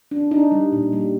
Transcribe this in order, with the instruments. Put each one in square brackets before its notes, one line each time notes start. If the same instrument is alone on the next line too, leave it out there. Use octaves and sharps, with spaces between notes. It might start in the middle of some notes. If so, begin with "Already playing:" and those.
[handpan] D4
D4 D#4
G3
A#2
G3